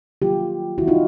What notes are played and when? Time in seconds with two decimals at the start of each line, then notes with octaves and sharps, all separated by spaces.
0.22 D#3 F#3 A#3 F4 G4
0.78 D#3 G3 C4 E4 F#4
0.88 D#4 F4